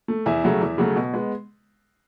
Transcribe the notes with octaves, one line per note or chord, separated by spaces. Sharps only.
A3
E2 E5 G#5
C#3 F#3 A3
E2
C#3 F#3 A3
B2
G#3 B3